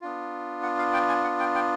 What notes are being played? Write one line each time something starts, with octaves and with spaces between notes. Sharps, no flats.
B3 D4 F4
F#5
F5
G5
G#5
F#5
G5
G5